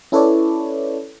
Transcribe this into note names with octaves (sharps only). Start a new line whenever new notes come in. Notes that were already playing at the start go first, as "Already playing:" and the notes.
C#4 E4 A4 B4 C#5 D5